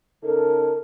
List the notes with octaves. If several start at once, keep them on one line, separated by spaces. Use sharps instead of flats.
C#3 D#4 A4 A#4